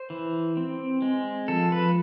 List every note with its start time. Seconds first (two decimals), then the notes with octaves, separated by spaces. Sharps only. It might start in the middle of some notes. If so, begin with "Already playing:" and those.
Already playing: C5
0.10 E3
0.57 C4
1.02 G#3
1.48 F3 A4
1.72 B4